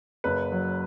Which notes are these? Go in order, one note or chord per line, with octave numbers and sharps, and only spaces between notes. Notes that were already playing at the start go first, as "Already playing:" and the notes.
F#1 B4
F#3